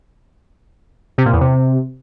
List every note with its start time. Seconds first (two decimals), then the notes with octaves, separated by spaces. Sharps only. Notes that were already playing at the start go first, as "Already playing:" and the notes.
1.18 C3
1.26 A#2
1.33 E2
1.41 C3